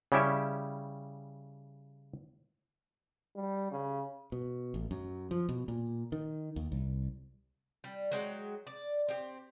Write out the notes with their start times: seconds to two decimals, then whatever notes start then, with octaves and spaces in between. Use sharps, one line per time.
0.12 C#3 G3 C#4 E4 G4 E5
3.36 G3
3.72 C#3
4.32 B2
4.74 A1
4.91 F#2
5.31 F3
5.49 B2
5.68 A#2
6.12 D#3
6.56 D#2
6.72 C2
7.84 G3
8.11 F#3 G#3 G5
8.67 D5
9.08 C4 G4